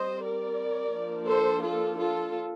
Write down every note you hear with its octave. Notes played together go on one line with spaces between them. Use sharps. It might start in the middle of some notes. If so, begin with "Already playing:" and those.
Already playing: G3 C4 C5 D#5
A#4 D5
F3 A#3 D4
A4 C5
F4 A4
F4 A4